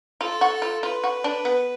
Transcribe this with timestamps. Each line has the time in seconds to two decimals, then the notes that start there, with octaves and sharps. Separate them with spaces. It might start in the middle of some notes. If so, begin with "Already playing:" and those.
0.21 F4 A4
0.41 F#4
0.62 F4
0.83 F4 B4
1.04 F#4
1.24 D4
1.45 B3